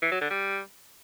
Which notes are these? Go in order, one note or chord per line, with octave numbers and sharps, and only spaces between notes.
E3
F#3
D3
G3